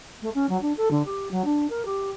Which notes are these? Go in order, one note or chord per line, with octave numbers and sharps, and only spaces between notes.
A3
C#4
F#3
D4
A4
D3
G4
F#3
D4
A#4
G4